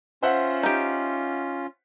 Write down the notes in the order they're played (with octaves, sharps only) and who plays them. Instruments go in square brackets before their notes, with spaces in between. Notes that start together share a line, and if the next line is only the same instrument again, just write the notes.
[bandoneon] C#4 F4 [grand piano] C5 E5 F#5
[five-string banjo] D#4 G4